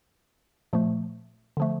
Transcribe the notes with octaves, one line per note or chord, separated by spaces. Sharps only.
A#2 F3 A3
D3 F3 A3